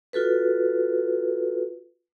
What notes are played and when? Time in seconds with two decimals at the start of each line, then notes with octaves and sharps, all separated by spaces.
0.13 F4 F#4 A4 B4